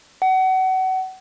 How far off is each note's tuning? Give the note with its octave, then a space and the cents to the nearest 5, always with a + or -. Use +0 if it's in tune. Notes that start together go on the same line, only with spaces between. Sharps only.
F#5 +30